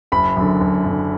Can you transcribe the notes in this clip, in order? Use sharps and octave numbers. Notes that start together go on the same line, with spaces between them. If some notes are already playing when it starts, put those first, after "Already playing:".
F#1 B5
F#2 D3
F#1
F#2 D3